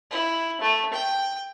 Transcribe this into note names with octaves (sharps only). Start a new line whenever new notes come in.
E4
A3
G5